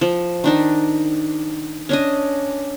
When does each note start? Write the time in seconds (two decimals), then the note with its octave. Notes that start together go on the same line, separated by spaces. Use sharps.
0.01 F3
0.44 D#3 D4 D#4
1.89 C#4 D4 D#5